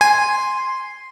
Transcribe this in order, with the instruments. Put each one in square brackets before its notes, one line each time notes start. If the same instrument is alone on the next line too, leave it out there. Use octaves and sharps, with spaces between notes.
[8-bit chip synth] G#5 [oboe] C6